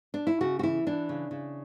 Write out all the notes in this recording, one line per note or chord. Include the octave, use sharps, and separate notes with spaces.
D4
E4
C#3 F#4
F#4
E3 E4
E3 D4
C#3
C#3